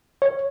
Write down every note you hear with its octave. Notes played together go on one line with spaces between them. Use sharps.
C#5